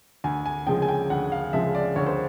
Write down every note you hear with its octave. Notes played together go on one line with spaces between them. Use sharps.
D2 G#5
G#5
C#3 F3 G#3 G5
G#5
G5
D2 F#5
F5
C#3 F3 G#3 E5
D5
D2 C#5
C5